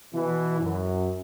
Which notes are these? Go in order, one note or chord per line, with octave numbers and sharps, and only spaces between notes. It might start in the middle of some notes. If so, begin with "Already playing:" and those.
B2 E3
F#2